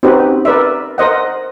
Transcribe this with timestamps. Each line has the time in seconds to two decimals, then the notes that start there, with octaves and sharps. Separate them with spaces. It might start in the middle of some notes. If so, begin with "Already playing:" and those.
0.03 C4 C#4 D#4 F#4 G4 B4
0.45 A#4 B4 D5 E5
0.98 A#4 C5 D#5 F#5